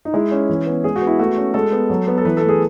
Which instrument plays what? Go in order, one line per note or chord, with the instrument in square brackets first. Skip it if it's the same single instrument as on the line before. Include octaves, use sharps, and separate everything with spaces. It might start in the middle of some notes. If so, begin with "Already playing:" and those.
[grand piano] D#4
G#3 E4
C#4
E3
B3
G#3 G#4
F#4
B3
E4
A3 F#4
C#4
G#3 A4
B3
F#3
B3
A4
E3 B4
A4
A3
G#4